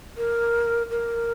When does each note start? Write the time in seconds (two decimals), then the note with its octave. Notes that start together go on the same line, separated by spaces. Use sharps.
0.17 A#4
0.90 A#4